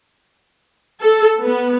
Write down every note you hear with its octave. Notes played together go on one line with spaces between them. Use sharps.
A4
B3